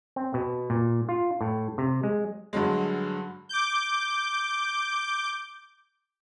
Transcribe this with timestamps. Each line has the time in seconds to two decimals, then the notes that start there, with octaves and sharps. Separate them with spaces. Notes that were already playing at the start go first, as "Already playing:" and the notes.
0.16 C4
0.34 B2
0.70 A#2
1.09 F4
1.41 A2
1.78 C3
2.03 G#3
2.53 G2 D3 F#3 G#3
3.49 D6 G6